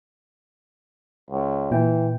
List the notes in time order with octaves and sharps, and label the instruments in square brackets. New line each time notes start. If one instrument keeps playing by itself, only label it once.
[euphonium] C#2
[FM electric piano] A#2 G5 [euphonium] E3